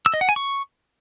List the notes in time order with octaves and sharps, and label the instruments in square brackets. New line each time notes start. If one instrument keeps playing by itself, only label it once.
[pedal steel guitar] E6
D#5
F#5
G#5
C#6